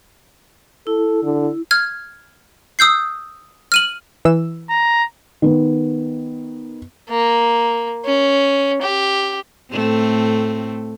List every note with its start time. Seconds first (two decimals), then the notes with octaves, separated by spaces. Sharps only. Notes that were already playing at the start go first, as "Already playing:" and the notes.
0.87 E4 A4
1.23 D3
1.71 F6 G#6
2.79 D#6 E6 G6 C7
3.72 F6 D#7 F#7
4.25 E3 E6
4.70 A#5
5.42 D#3 B3
7.09 A#3
8.05 C#4
8.82 G4
9.71 A2 A3 C4